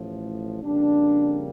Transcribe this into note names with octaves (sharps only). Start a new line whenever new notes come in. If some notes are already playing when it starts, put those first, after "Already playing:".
Already playing: A1 A2 F3
F2 C#3 G3 A#3 D4